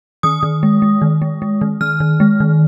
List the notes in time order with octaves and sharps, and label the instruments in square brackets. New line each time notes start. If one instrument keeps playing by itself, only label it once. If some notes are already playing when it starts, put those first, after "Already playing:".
[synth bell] D#3 D#6
D#3
G#3
G#3
D#3
G#3
G#3
D#3
D#3 F6
D#3
G#3
D#3